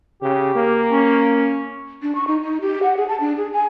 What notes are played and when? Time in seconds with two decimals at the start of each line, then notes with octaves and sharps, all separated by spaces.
0.22 C#3 G4
0.55 A#3
0.91 C#4
2.02 D4
2.15 C#6
2.27 D#4
2.42 D#4
2.61 G4
2.83 F#5
2.97 G#4
3.08 A5
3.20 D4
3.37 G#4
3.53 G#5